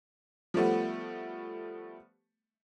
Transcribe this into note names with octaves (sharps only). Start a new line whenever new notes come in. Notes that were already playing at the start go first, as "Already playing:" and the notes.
F3 G3 A3 B3